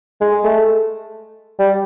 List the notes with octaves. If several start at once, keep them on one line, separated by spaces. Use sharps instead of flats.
G#3
A3
G3